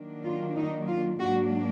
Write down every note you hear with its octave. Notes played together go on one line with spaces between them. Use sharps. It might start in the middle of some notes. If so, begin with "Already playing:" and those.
Already playing: D#3 F#3 A#3 D4
F4
D#4
F4
G#2 F#3 A#3 D4 F#4